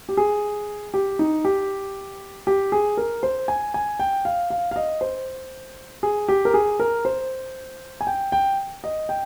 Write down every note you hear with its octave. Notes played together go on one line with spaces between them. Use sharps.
G4
G#4
G4
D#4
G4
G4
G#4
A#4
C5
G#5
G#5
G5
F5
F5
F5
D#5
C5
G#4
G4
A#4
G#4
A#4
C5
G#5
G5
G5
D#5
G5